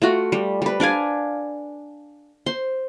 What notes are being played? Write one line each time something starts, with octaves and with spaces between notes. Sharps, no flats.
A3 F4 F#4
G3
G3 B4
D4 D5 F5 G#5
C5 C6